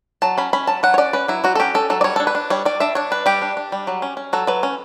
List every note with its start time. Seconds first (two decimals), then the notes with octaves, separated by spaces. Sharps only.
0.22 F#3 A5
0.38 C#4 B5
0.53 C#4 B5
0.67 F#3 A5
0.83 F#3 F#5
0.94 C#5
0.98 C#4 D5
1.13 C#4 B4
1.28 F#3 E4
1.44 F#3 F#4
1.55 A4
1.60 C#4 G4
1.74 C#4 A4
1.90 F#3 A4
2.01 D5
2.04 G3 C#5
2.16 D4 A4
2.27 B4
2.35 D4
2.50 G3 C#5
2.65 G3 D5
2.80 D4 E5
2.95 D4 C#5
3.11 G3 B4
3.26 G3 G4
3.42 D4
3.57 D4
3.72 G3
3.87 F#3
4.02 C#4
4.17 C#4
4.33 F#3 A4
4.47 F#3 B4
4.63 C#4